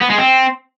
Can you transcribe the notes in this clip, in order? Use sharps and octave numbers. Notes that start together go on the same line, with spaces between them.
B3
G#3
C4